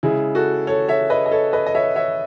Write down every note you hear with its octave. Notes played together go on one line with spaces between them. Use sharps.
C#3 G#3 E4 G#4
F#4 A4
A4 C#5
C#5 E5
B4 D#5
D#5
A4 C#5
B4 D#5
D#5
C#5 E5
C#5 E5